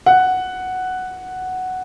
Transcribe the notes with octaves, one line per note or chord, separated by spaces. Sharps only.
F#5